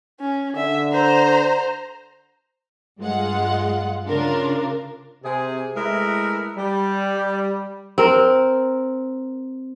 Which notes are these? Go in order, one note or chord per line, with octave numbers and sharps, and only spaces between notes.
C#4
D3 E5
C5 A#5
G2 G#3 F4 F#5
C#3 D4 F4 A#4
C3 G#4
G#3 A3 E4 A#4 B4 E5
G3
C4 A#4